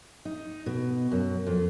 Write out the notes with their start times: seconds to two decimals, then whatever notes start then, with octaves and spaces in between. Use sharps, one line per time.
0.25 D#4
0.66 B2
1.11 F#2
1.47 F2